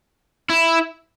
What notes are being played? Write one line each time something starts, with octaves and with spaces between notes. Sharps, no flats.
E4